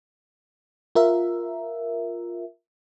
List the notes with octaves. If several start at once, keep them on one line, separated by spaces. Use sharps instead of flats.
F4 A#4 E5